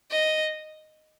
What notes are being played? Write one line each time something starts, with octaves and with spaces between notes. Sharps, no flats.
D#5